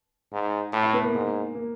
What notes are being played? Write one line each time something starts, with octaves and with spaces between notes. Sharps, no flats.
G#2
A2
E4
B3
A#3
G#2
A#3